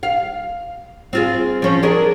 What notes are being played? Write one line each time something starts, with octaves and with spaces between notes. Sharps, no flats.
F5
C4 F4 G#4
F3 C#4
D4 G#4 A#4